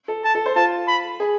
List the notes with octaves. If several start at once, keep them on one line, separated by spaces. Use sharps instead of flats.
A4
A5
A4
C5
F4 A5
B5
G#4